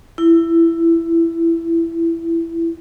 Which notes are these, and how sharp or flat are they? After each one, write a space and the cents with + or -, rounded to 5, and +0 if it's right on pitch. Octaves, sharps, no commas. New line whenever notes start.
E4 +15